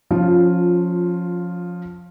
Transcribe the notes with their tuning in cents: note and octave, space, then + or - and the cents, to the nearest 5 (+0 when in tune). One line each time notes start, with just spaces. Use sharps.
F3 +15 C#4 +0 F4 +0